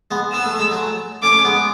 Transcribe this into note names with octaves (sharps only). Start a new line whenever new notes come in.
G#3 B3
B3 E6
A3
G#3
F#3 A3
A3 C#4 D6
C#4
G#3 B3